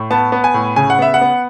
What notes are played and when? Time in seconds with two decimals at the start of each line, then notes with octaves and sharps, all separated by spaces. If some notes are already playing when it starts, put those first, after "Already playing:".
Already playing: A2
0.11 B3 A5
0.32 B3
0.44 G#5
0.54 A2
0.76 C#3 G#5
0.90 F#5
0.99 B3 E5
1.14 F#5
1.21 B3